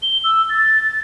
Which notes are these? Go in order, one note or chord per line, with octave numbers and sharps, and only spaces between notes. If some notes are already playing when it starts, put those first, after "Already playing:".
G7
E6
A6